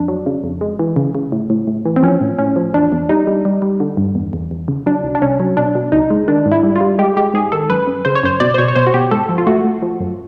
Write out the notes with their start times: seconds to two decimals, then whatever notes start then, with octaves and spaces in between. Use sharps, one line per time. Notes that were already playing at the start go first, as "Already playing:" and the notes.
Already playing: F2 D4
0.08 F#3
0.26 C#3
0.44 F2
0.61 G#3
0.79 E3
0.96 C#3
1.15 C#3
1.32 A2
1.50 A2
1.67 A2
1.85 E3
1.96 C4
2.03 F3 C#4
2.21 A2
2.39 A2 C#4
2.56 F3
2.73 E2 D4
2.92 E2
3.09 G3 D#4
3.27 G3
3.45 G3
3.62 G3
3.80 D3
3.97 G2
4.15 E2
4.33 E2
4.51 E2
4.68 C#3
4.86 F#3 D4
5.04 C2
5.15 D4
5.22 C2 C#4
5.40 F#3
5.57 B2 D4
5.75 B2
5.92 C#2 D#4
6.10 G#3
6.28 D#3 D4
6.46 G#2
6.52 E4
6.63 G3
6.76 F4
6.81 G3
6.99 G#3 G4
7.17 G#3 G4
7.34 G#2 G#4
7.52 D#3 A4
7.70 F#2 B4
7.87 F#2
8.05 C#3 C5
8.15 C#5
8.23 F#2 C5
8.40 B2 D5
8.54 C5
8.58 B2 C#5
8.68 C#5
8.75 B2 C5
8.87 F#4
8.94 B2 G4
9.11 G#2 A4
9.29 F3
9.38 F4
9.47 A3 F#4
9.64 A3
9.82 F3
10.00 F#2